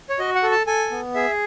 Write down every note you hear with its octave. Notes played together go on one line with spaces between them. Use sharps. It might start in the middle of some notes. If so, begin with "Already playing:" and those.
C#5
F#4 D#5
F#5
A4
A5
A4 G#5
B3
G#4 E5